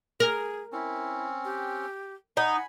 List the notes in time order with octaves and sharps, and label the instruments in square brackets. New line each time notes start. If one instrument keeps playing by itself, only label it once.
[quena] G#4 [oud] A#4
[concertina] C4 C#4 [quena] E4
[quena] G4
[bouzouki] D#4 [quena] F#5 [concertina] G#5 B5